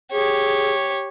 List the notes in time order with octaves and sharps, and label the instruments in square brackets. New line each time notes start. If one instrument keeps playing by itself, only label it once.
[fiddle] G4 C#5 [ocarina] G#4